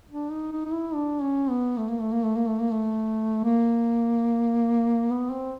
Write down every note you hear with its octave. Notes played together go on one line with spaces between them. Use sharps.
D4
D#4
D#4
D#4
E4
D4
C#4
B3
A3
A#3
A3
A#3
A3
A#3
A3
A#3
A3
A#3
B3
C4